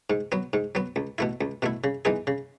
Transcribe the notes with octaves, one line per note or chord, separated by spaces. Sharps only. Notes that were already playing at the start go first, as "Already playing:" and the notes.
G#2
F#3 B3
G#2
F#3 B3
C#2
B2 A3 E4
C#2
B2 A3 E4
C#3
E3 B3 D#4 G#4
C#3